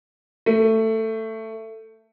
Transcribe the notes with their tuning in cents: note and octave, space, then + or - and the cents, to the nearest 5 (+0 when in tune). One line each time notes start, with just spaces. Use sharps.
A3 +15